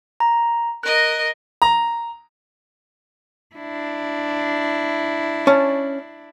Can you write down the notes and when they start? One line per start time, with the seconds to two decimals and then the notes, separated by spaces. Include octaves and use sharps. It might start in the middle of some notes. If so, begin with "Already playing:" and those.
0.20 A#5
0.83 A#4 D#5 F#6
1.62 A#5
3.55 D4 E4
5.47 C#4 A5